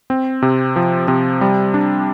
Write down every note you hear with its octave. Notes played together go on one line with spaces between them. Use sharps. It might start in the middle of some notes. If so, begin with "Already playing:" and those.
C4
C3
F3
C3
G3
D4